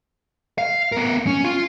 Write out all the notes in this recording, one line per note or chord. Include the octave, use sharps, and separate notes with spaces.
F5
B3 A#4
C#4
F4